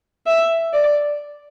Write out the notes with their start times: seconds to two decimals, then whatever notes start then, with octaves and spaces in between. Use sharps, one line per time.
0.27 E5
0.73 D5